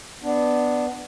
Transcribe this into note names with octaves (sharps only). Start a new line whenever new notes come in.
B3 D4